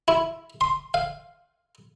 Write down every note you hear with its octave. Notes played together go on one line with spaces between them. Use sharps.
E4
C6
F5